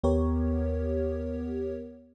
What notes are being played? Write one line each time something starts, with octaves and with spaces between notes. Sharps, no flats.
D#2 B3 G4 A#4 C#5